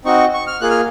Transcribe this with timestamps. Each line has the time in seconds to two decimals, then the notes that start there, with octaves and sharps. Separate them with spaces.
0.05 C4 D#4 F#4 C#6
0.34 C#6
0.47 F6
0.61 A#3 F4 G#4 F#6
0.71 F6